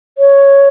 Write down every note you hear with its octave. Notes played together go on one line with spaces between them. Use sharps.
C#5